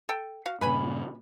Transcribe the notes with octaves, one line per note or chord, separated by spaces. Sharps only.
A4 G5
F#4 F5
G2 A#2 C#3 B4 G#5 B5